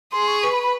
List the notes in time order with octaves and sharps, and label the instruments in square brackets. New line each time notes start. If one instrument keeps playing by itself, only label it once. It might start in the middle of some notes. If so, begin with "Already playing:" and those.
[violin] G#4 [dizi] C6
[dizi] C#6
[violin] B4 [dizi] C#6
[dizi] B5
B5